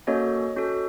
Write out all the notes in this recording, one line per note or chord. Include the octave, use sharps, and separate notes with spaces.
A#3 C#4 F#4 A4 C#5 D#5
C#4 F#4 A4